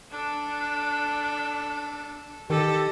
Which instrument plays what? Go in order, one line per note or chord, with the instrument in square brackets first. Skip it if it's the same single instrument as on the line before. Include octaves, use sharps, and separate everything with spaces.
[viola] D4 [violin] A4
[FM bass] D#3 [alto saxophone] G4 [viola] A4 [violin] D#5